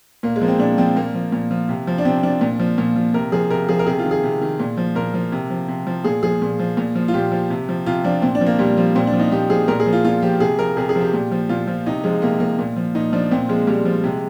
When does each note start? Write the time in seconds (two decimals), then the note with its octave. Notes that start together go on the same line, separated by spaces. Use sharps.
0.23 A#2 A#3
0.36 G#3
0.42 F3 A#3
0.48 C4
0.59 A#2 D4
0.78 F3 C4
0.96 A#2 A#3
1.14 F3
1.32 A#2
1.51 F3
1.69 C3
1.87 F3
1.98 D4
2.05 C3 C4
2.23 F3 D4
2.41 A#2
2.60 F3
2.78 A#2
2.96 F3
3.14 C3 A#4
3.32 F3 G#4
3.50 C3 A#4
3.69 F3 G#4
3.79 A#4
3.87 C3 G#4
3.99 F4
4.04 D#3
4.11 G#4
4.23 C3
4.41 D#3
4.60 A#2
4.77 F3
4.95 A#2 A#4
5.14 F3
5.32 C3
5.50 F3
5.68 C3
5.87 F3
6.04 A#2 G#4
6.23 F3 G#4
6.42 A#2
6.59 F3
6.77 A#2
6.95 F3
7.08 F4
7.14 A#2 G4
7.32 F3
7.50 C3
7.69 F3
7.86 C3 F4
8.04 F3 D4
8.22 A#2 C4
8.35 D4
8.41 F3
8.46 A#3
8.59 A#2 G3
8.77 F3
8.95 A#2 C4
9.07 D4
9.13 F3
9.20 D#4
9.32 A#2 G4
9.50 F3 G#4
9.68 A#2 A#4
9.80 G#4
9.86 F3
9.93 F4
10.05 A#2 F4
10.22 F3 G4
10.40 C3 G#4
10.59 F3 A#4
10.77 C3 G#4
10.89 G#4
10.96 F3
11.01 G4
11.14 A#2
11.32 F3
11.49 A#2 F4
11.68 F3
11.86 C3 D#4
12.04 F3 G#3
12.22 C3 A#3
12.40 F3 A#3
12.59 A#2
12.76 F3
12.95 A#2 D#4
13.13 F3 D4
13.31 A#2 C4
13.49 F3 G#3
13.67 A#2 G3
13.85 F3
14.03 C3 G#3